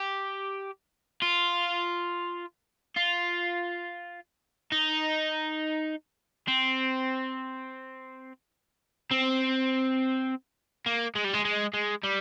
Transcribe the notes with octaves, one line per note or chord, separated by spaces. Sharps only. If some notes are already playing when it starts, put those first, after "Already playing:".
Already playing: G4
F4
F4
D#4
C4
C4
A#3
G#3
G3
G#3
G#3
G#3
G3